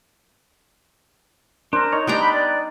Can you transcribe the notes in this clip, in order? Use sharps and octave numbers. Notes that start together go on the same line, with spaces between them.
D4 A#4 C5
D#4 C#5
G3 B3 D4 D#5 G5 A#5 D6
B5
D5